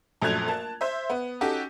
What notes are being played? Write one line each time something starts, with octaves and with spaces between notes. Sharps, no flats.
A#1 F#2 A3 F#6 G#6 F7
A#3 A5
C5 E5
B3
C#4 D#4 F#4 G4 A4